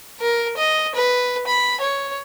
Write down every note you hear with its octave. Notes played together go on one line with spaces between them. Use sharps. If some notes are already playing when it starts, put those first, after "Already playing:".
A#4
D#5
B4
B5
C#5